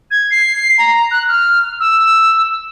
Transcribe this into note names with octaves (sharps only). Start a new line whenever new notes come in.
G#6
C7
A#5
F#6
F6
E6